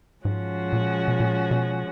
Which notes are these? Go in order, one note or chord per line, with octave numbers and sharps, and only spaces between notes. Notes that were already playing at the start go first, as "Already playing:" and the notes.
G#2 F3 G#3 C#4 F#4
A#2
B2
A#2
B2